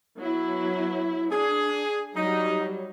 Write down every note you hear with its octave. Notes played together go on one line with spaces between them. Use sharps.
F#3 B3 E4
D4 G#4
F#3 G3 D#4